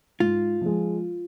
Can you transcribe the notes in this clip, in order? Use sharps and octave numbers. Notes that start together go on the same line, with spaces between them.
G#2 F4
F3 G#3